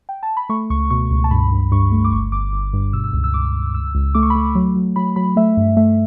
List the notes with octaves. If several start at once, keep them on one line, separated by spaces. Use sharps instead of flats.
G5
A5
B5
A3 C#6
C#2 C#6
B2 C#6
C#2
A5
G2 B5
G2
G2 C#6
A3
D6
G1 C#6
G1 D6
G1
G2
B2 E6
E6
C#2
E6
C#2 D6
C#2
C#2 E6
C#2
A3 D6
C#6
B5
A3 C#6
F#3
F#3
F#3 B5
F#3 B5
A3 E5
G2
A3 E5